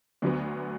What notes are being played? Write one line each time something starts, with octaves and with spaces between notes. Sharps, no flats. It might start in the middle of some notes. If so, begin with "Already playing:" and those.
D2 D3 F#3 B3